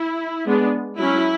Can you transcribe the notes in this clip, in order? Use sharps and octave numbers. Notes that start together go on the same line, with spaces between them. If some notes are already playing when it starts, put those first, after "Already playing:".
Already playing: E4
G#3 B3 D4
F#3 C#4 E4